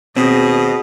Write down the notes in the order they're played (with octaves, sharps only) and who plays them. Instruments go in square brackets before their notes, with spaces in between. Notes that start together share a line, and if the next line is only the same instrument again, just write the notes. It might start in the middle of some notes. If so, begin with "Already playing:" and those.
[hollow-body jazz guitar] D#2 C4 [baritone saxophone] B2 [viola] G#4 D#5